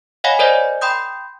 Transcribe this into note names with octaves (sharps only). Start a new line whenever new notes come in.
C#5 D#5 F5 F#5 G#5 B5
A#4 C5 D5 D#5 G#5
G5 B5 C6 D#6 G6